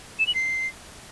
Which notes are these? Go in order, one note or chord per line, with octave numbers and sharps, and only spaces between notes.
E7
F#7
C7